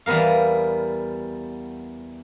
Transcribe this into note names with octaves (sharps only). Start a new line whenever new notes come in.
E2 G3 B3 A#4 F5